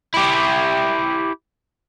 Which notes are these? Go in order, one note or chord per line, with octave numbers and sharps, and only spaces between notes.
E4 G4